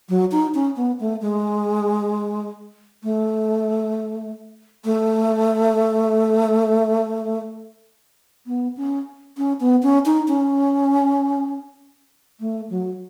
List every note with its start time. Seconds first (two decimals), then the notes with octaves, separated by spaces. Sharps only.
0.09 F#3
0.31 D#4
0.54 C#4
0.76 B3
1.00 A3
1.21 G#3
3.03 A3
4.85 A3
8.47 B3
8.77 C#4
9.37 C#4
9.60 B3
9.83 C#4
10.06 D#4
10.28 C#4
12.40 A3
12.70 F#3